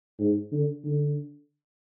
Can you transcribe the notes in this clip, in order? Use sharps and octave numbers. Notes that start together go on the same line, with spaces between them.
G#2
D3
D3